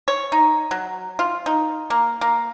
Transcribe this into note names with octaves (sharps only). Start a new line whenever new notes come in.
C#5
D#4
F#3
F4
D#4
A#3
A#3